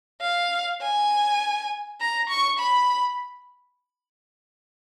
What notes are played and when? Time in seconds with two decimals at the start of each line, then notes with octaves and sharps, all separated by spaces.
0.22 F5
0.82 G#5
2.00 A#5
2.29 C#6
2.59 B5